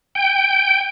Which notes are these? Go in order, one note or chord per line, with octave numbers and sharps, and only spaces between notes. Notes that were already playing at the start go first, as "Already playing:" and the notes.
G5